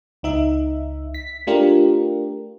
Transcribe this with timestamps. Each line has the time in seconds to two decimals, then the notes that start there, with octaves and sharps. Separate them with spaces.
0.23 C#2 D#4 E5
1.14 B6
1.47 A3 D4 F4 G4 A#4